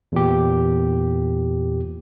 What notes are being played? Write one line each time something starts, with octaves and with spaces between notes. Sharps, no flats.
E2 A#2 G4